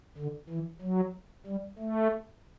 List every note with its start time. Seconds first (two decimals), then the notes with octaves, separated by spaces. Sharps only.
0.18 D3
0.49 E3
0.81 F#3
1.46 G3
1.79 A3